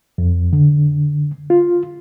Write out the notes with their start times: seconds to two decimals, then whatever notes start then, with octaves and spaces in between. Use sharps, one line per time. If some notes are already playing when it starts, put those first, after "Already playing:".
0.18 F2
0.53 D3
1.50 F4